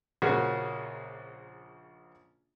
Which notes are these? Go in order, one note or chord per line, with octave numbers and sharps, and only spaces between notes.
A#1 C#3 A#3 C#4 F#4 G#4